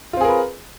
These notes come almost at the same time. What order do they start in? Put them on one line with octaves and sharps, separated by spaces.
F4 C4 G#4 A#4 B4